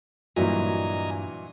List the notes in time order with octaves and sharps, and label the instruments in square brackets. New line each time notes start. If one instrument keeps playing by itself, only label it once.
[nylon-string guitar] G2 [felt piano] A#2 E3 F#3 [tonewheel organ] D#5 G#5 A#5